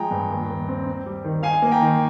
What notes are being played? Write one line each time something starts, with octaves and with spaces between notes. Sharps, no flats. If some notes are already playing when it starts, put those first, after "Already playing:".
Already playing: F3 G#3 G5 A#5
G2
D#2
D#2
C4
C4
G3
D#3
D#4 F5 G#5
A#3
G5 A#5
D#3